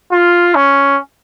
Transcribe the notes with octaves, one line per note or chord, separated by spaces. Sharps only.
F4
C#4